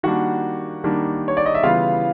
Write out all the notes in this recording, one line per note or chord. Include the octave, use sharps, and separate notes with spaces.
D#3 G3 A#3 D4 F#4 F#5
D#3 G3 A#3 D4
C#5
D5
D#5
E5
C#3 E3 G3 B3 F4 F5